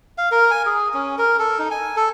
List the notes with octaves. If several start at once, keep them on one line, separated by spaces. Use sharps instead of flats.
F5
A#4
G#5
G#4
C#4
A#4
A4
D#4
G#5
A4